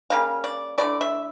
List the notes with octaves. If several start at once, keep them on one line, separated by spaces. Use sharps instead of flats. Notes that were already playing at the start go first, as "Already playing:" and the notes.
C#3 G3 A#3 F5
D5
D3 A3 E4 D5
E5